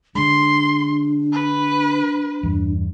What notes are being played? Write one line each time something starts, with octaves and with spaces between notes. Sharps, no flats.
D3 G#3 D4 C6
B4
E2 G2